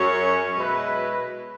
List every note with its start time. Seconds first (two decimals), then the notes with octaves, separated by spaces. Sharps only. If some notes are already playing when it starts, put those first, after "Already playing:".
Already playing: F#2 F#3 C#4 G#4 C#5
0.56 B2 G#3 E4 B4